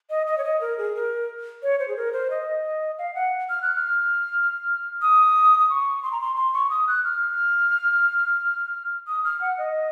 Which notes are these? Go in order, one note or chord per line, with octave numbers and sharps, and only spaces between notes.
D#5
D#5
C#5
D#5
A#4
G#4
A#4
C#5
C5
G#4
A#4
C5
D#5
F5
F#5
F6
F#6
F6
D#6
D#6
C#6
C6
A#5
C6
C6
C#6
D#6
F#6
F6
D#6
F6
F#5
D#5